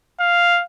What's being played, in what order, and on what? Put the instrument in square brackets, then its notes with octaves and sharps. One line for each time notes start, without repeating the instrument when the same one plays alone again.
[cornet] F5